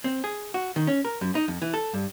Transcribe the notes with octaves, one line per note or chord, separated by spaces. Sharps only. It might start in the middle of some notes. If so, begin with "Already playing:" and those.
C4
G#4
F#4
D#3
C#4
A#4
F#2
D#4
F2
E3
A4
G2